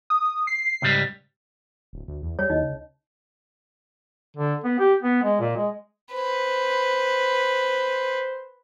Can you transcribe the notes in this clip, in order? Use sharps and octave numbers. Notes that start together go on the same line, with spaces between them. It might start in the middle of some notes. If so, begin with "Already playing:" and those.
D#6
C7
C#2 G#2 G3
D1
D2
E2
G3 C#5
D#2 D#4 D#5
C#2
D3
B3
G4
B3
G#3
A#2
G#3
B4 C5